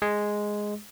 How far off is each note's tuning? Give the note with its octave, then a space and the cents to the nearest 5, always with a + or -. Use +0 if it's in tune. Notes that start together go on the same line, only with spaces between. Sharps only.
G#3 +0